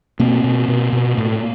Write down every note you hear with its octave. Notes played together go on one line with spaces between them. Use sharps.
B2 A#3 C4
B2
B2
B2
A2